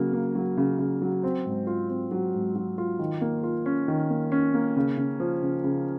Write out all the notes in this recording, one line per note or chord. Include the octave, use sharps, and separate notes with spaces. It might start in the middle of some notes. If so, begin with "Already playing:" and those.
Already playing: C#3 F#3 A#3
A#3
F#3
C#3
C#3
F#3
C4
G#2
F4
C4
F#3
G#2
F#3
F4
D#3
A#3
F4
C#4
D#3
A#3
C#4
A#3
C#3
C#3
F3
C#3
C#3